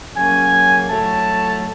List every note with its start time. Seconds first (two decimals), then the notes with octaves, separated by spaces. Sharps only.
0.15 C#3 F#3 A#3 C#4 G#5
0.89 A2 F#3 A3 A5